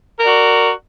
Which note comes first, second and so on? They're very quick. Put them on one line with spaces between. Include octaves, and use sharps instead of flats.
A#4 D5 F#4